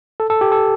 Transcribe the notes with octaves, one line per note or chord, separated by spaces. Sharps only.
A4
A4
G4
A4